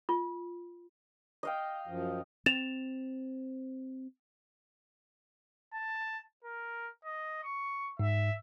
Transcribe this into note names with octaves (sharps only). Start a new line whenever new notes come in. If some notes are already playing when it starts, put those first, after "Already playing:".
F4
D#5 F5 G5
F#2 F3
C4 A6 E7 F7
A5
A#4
D#5
C#6
G#2 E5